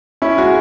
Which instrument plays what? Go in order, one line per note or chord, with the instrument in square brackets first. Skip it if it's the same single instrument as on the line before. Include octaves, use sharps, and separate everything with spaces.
[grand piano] C#4 [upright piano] E4
[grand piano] G#3 [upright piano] F#4